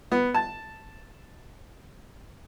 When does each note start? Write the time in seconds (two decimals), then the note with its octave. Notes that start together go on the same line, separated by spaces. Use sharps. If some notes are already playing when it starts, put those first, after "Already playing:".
0.12 B3
0.34 A5